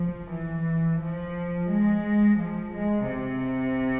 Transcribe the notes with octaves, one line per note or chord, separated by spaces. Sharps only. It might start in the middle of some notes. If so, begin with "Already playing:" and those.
Already playing: F3
E3
F3
G#3
F3
G#3
C3